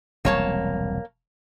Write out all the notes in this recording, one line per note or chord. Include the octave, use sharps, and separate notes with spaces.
E1 C2 F#3 A#3 C#5 A5